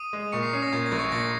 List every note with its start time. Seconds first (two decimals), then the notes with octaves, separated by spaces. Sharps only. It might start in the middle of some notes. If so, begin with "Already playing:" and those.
Already playing: D#6 D#7
0.13 G#3
0.32 A#2 C#6 C#7
0.43 C7
0.53 C#4 C7
0.63 A#6
0.73 A#2 G#6
0.86 A#6
0.92 A#1
0.99 C#6 C#7
1.12 A#2 A#6